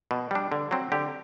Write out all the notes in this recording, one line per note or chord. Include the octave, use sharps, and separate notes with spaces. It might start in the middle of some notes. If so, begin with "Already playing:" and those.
B2
G3 D4
D3
F#3 C4
D3 G4